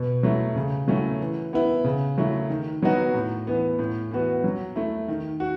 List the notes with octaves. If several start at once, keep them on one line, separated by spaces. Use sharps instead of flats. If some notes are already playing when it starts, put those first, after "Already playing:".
Already playing: B2
F#3 A3 E4
C#3
F#3 A3 C#4 E4
E3
B3 E4
C#3
F#3 A3 E4
D#3
F#3 B3 D#4 F#4
A2
E3 B3
A2
E3 B3 F#4
F#3
A3 E4
D#3
F#4